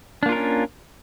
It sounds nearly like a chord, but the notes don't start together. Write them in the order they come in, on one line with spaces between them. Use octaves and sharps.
D4 A#3 F4 A#4 C#4